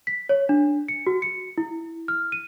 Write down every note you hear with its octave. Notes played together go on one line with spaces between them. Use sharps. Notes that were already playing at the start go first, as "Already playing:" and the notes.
B6
C#5
D4
C#7
F#4
C#7
E4
F6
D#7